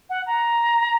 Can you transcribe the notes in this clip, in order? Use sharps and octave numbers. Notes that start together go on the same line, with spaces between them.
F#5
A#5